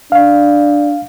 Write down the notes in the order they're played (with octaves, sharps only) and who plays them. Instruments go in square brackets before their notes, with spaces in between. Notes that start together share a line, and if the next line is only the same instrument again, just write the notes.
[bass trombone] D4 [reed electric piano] F5